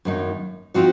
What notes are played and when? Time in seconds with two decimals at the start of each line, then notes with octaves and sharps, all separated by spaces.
0.05 F#2 D#3 A#3 D#4
0.74 F3 C4 D#4 F#4